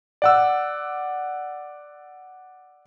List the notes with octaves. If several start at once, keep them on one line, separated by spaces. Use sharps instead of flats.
D5 F#5 E6